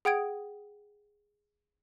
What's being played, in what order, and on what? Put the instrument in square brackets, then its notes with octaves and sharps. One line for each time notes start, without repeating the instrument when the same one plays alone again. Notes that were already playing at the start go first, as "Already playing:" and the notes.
[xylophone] G#4 F#5 G5 D#6 G#6 D7